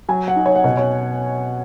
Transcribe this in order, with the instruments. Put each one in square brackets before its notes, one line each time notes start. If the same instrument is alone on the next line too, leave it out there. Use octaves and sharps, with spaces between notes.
[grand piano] F#3 [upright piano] G#5
[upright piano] F#5
[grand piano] D#4 F#4
[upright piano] C#5
F#5
[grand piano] B2 [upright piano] D#5
[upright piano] C#5